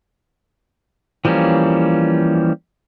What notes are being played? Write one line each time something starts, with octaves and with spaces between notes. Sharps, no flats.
E3 F3 G3 A#3 C#4